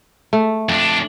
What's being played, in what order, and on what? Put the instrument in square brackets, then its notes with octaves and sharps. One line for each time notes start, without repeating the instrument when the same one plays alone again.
[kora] A3
[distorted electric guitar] F2 D4